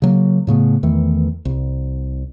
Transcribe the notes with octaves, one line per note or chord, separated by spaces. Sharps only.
C#3 F#3 A#3
A2 C#3 A3 B3
E2 D#3 E3 A3
C2